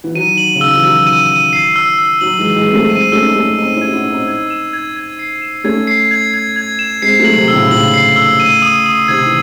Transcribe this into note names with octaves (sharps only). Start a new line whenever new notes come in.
E3
D#3 F#3 D#7
F#7
C#3
D#3 E6
E3
D#3 F#3 E6
D#7
D#7
C7
E6
E6
D#3 F#3 F#7
E3 G#3
E6
E3 G#3
C4 F#7
F#3 A3
G#3 C4 D#7
A3 C#4 E6
D#4
A3 C#4 D#7
C4 D#4 D#7
C#4 E4
G#6
F#4
C#4 E4
D#7
C4 D#4
G#6
E7
G#6
G#6
C7
E7
A3 C#4 G#6
C7
G#6
G#6
G#6
E7
G#3 C4 C7
F#3 A3
F#7
C3
D#3 E6
A2 C#3
A2 C#3 F#7
C7
E6
D#7
D#6
D#6
C3 D#3 G#6
E3